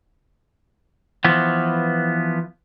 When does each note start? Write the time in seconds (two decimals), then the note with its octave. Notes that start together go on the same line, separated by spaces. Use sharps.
1.24 E3 F3 B3